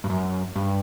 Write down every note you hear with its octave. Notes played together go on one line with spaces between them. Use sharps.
G2
F#2
G2